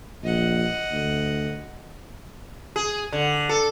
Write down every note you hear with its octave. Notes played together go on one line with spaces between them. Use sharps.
A#1 D#5 F#5
D2
G#4
D3
A4